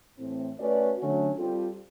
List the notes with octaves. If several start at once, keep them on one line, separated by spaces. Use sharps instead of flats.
A2 E3 A3 C4
A3 C#4 F#4 B4 D5
D3 F#3 A3 C#4 F#4
G3 C4 F4 A4